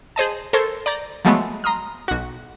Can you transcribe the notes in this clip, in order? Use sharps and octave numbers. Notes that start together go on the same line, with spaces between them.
G#4 C5 D#5 A5
A4 A#4 C5 C#6 G#6
D5 A#5 G6 A#6
F3 F#3 G#3 A3 B3
A#5 C6 D#6 F6
B1 F#4